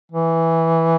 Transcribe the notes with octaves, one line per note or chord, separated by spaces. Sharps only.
E3